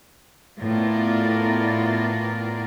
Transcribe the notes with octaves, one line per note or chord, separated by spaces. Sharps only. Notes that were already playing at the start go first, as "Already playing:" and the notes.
A2 B3 F4 A#4 D5